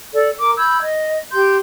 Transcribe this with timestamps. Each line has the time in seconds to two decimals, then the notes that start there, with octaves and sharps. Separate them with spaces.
0.14 A4 D5
0.39 A#4 D6
0.57 B5 E6 G6 G#6
0.82 D#5
1.33 G4 C6 G6